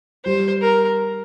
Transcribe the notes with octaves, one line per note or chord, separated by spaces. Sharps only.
G3 C5
A#4